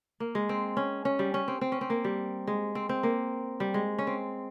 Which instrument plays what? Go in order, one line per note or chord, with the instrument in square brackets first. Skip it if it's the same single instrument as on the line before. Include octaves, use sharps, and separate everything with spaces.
[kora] A#3
G#3
C4
C#4
C#4
G3
C#4
C4
C4
C#4
C4
A#3
G3
G#3
C4
C4
A#3
G3
G#3
C#4
C4